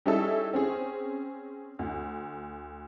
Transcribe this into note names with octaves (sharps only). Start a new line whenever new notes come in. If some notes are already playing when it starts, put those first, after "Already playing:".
G3 C#4 D#4 E4 G#4 A4
C4 C#4 G#4
D2